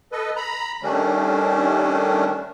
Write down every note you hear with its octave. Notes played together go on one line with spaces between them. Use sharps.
A4 B4 D#5
A#5 B5
D#3 G3 A3 C#4 D4